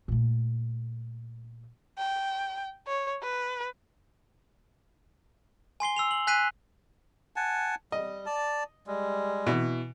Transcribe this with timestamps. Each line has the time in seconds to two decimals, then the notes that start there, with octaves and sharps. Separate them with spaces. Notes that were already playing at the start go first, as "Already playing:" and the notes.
0.08 A#2 A3
1.98 G5
2.87 C#5
3.22 B4
5.80 G#5 C6 C7 G7
5.96 E6 C7 F7
6.11 F#7
6.27 G#5 F#6 B6 C7 D#7
7.36 F#5 G#5 A5
7.92 G3 D#5
8.26 D5 A5
8.87 G3 G#3
9.47 B2 E3